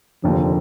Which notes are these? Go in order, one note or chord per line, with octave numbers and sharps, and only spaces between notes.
F1 D#2 D3 F3